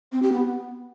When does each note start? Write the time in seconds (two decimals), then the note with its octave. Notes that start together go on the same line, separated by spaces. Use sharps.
0.12 C4
0.22 G4
0.33 B3